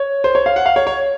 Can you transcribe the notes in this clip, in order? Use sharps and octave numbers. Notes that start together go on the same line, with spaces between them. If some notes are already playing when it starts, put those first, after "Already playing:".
Already playing: C#5
C5
C#5
F5
F#5
F5
C#5
C#5